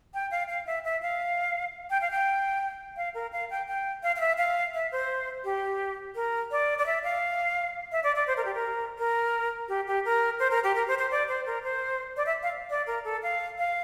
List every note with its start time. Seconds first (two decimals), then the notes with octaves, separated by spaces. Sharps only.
0.14 G5
0.31 F5
0.49 F5
0.67 E5
0.84 E5
1.02 F5
1.90 G5
2.01 F5
2.11 G5
2.97 F5
3.14 A#4
3.32 F5
3.50 G5
3.67 G5
4.03 F5
4.16 F5
4.20 E5
4.38 F5
4.74 E5
4.92 C5
5.44 G4
6.15 A#4
6.51 D5
6.78 D5
6.86 E5
7.04 F5
7.92 E5
8.04 D5
8.16 D5
8.27 C5
8.37 A#4
8.45 G4
8.54 A#4
8.99 A#4
9.69 G4
9.87 G4
10.05 A#4
10.40 C5
10.51 A#4
10.64 G4
10.76 A#4
10.88 C5
10.98 C5
11.11 D5
11.28 C5
11.46 A#4
11.63 C5
12.17 D5
12.26 E5
12.43 F5
12.70 D5
12.87 A#4
13.05 A4
13.23 F5
13.58 F5